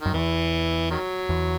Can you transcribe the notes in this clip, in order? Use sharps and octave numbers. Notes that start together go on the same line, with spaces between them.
F#2 D#3
E2 E3
D#3 F#3
E2